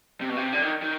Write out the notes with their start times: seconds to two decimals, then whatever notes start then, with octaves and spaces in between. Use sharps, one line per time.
0.21 C3
0.29 B2
0.37 C3
0.53 D3
0.62 D#3
0.82 D#3